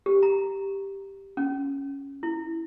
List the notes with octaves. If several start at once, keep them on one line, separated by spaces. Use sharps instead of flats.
G4
A#5
C#4
E4